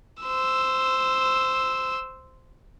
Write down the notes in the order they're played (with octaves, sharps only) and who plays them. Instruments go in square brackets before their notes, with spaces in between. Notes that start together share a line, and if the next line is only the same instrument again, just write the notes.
[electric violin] C5 E6